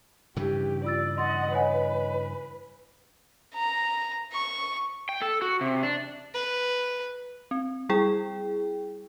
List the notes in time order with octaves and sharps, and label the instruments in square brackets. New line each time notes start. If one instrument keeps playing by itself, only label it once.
[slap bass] G2 C#3 E3 [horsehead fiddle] G4
[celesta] F4 E6 A6 [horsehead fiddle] D5
[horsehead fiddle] D#5 F#5 [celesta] C6 A6
[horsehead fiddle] B4 [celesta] C#5 D#5 G#5
[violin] A#5
C#6
[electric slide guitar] G5
A4
F#4
C3
D4
[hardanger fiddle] B4
[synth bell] C4
G3 E4 G#4 G5